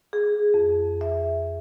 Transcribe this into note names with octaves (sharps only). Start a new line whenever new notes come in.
G#4
F2
E5